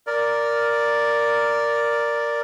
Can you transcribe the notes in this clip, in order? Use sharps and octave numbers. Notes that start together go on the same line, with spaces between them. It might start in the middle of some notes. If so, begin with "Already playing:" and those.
A#4 D5